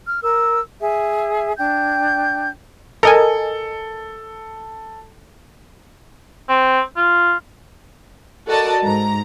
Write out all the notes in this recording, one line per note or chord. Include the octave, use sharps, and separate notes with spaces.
F6
A#4 E6
G#4 E5
D4 G5 G6
A4 A#4 D#5 G#5
C4
F4
F#4 A4 A#4 D5 D#5 A5
G#2 A#5